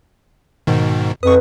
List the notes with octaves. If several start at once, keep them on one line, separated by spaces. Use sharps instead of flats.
G#2 B2 D#3
F2 B4 C#6 D#6